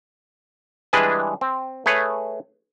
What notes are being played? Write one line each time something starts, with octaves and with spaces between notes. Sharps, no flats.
E3 G3 G#3 D4 G#4 B4
C4
A3 G#4 B4 C#5